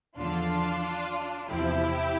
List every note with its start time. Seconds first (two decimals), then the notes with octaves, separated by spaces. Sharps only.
0.17 E2 D3 F3 D4 F4
1.48 E2 C3 F3 E4 G4